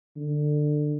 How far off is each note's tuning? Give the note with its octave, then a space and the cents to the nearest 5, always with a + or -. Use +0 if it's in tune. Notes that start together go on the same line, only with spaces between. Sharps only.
D3 +20